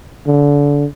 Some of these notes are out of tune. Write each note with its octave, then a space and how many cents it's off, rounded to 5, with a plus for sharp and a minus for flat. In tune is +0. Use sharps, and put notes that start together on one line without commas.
D3 -30